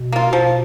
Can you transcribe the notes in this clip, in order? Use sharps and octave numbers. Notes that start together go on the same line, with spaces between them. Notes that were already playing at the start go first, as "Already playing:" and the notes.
Already playing: B2
A#3 F4
B2 F3